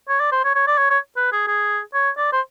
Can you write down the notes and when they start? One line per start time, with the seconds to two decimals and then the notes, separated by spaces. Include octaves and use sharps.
0.09 C#5
0.20 D5
0.32 C5
0.44 C#5
0.55 C#5
0.67 D5
0.78 C#5
0.90 C#5
1.17 B4
1.32 G#4
1.47 G#4
1.94 C#5
2.17 D5
2.32 C5